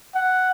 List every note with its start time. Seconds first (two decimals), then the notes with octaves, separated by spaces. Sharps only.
0.15 F#5